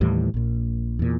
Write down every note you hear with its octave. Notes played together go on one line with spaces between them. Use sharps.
D#2 A2 E3 G3
A#1 A#2
E2 A#2